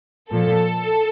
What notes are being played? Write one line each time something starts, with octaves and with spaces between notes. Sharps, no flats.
A#2 F3 A4